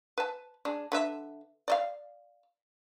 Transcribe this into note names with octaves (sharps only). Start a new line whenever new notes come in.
B4 A5
G#3 D4
D3 B4 E5
D5 D#5 F5